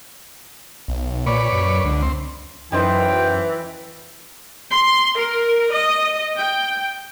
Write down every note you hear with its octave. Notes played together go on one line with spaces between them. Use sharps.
B1
A#2 B4 C#5 D5
F#2
C#2 D3
C4
F#2 E3 B3 D#4 C5 G5
C6
A#4
D#5
G5